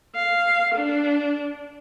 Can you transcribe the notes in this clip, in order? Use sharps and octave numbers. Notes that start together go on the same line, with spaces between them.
F5
D4